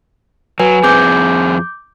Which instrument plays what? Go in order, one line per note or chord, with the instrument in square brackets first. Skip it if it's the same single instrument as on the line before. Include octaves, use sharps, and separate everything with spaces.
[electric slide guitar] F#3 [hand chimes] B4 G#5
[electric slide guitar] F2 C4 G#4 [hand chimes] D6 G6